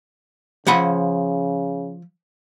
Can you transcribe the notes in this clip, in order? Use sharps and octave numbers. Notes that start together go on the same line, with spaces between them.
C#3 F3 F#5 B5